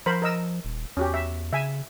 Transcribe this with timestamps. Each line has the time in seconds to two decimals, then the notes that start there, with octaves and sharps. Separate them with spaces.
0.06 F3 A#4 C5 B5
0.22 A#4 D#5 E6
0.65 D#1
0.97 E2 C#4 F#4 G4
1.14 E5
1.53 C#3 E5 G#5